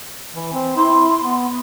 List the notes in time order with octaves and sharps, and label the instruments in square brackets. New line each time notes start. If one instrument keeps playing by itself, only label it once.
[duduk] E3
C4
[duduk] E4 [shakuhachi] C6
[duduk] B3